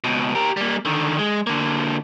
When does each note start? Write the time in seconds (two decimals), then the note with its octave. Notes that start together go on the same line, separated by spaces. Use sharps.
0.04 C#2 B2
0.35 G4 A#4
0.57 G3 A#3
0.85 D3 D#3
1.19 G#3
1.47 D3 A#3